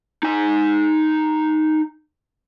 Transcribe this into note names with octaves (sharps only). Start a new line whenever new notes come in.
D#4 G#5